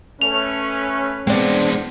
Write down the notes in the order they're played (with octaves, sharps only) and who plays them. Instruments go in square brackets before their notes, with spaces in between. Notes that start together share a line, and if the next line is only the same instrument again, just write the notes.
[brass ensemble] A3 C#4 B4 [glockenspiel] F7
[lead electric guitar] G#3 B3 [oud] C4 D4